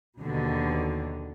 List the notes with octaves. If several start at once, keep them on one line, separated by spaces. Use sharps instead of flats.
D#2 B2 D3